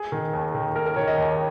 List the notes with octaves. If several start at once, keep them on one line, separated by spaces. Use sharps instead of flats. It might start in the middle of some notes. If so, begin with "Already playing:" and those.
Already playing: G#4
D#3
D#2
D#3
D#2 A#4
A#4
D#3 C#5
D#5
D#2